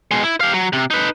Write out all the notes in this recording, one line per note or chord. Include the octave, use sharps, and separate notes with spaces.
B2 G#3
E4
G4 F5
F#3
C3
D#4 B4